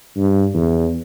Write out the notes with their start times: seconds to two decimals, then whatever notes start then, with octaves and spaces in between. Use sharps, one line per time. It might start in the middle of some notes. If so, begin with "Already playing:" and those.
0.17 G2
0.54 E2